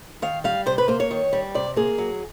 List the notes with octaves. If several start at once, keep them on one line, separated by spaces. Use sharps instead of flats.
D#3 F5
G3 F5
C3 C5
B4
A#3 C5
C#5
D#3
G3
C3 D5
A#3 G#4
F#3